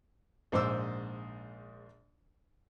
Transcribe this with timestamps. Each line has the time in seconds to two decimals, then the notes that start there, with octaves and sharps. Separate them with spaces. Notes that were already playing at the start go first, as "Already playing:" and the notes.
0.52 A#1 G#2 C5 D6 E6